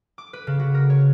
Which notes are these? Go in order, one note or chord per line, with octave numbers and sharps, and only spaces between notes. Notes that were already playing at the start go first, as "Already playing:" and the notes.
D6
B4
C#3
F#4
A#4
C#5